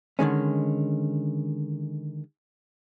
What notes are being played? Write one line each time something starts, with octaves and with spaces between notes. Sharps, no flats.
D3 D#3 G#3 C#4